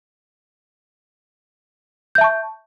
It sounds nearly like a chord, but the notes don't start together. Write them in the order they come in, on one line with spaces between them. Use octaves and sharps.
G6 E5 A5 C#6